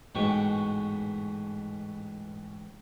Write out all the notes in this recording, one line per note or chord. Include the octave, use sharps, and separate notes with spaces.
A1 G#2 B2 G5 C#6